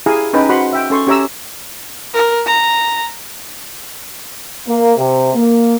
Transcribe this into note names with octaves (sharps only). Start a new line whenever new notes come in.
E4 G4 G#4 F5 G#5 A#5
C#4 D#4 B4 G5
F#4 C5 F#5 B5 C6
E5 G5
C#4 A4 C6 C#6
C#4 G4 C#5 E5 A#5 E6
A#4
A#5
A#3
C3
A#3